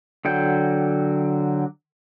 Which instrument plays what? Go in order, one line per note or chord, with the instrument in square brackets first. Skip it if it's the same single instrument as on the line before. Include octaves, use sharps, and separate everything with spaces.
[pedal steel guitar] D3 F#3 G5